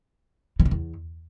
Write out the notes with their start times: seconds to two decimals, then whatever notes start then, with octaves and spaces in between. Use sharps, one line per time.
0.60 E3
0.65 D3
0.71 E2